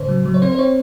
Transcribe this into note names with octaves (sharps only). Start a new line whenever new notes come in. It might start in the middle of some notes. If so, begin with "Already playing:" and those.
Already playing: A2 C#3 C5
F#3
F#3
C#5
C4 C5
C5
C4 C#5